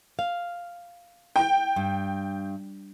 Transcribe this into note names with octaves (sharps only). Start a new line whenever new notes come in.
F5
G5
G2